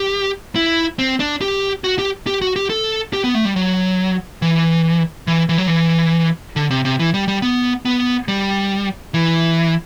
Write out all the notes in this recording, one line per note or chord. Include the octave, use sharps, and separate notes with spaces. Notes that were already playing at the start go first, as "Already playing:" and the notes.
Already playing: G4
E4
C4
D4
G4
F#4
G4
G4
F#4
G4
A4
G4
B3
A3
G3
F#3
E3
E3
E3
F#3
E3
D3
C3
C3
E3
G3
G3
B3
B3
G3
E3